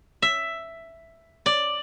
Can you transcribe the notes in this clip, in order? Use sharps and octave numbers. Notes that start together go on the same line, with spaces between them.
E5
D5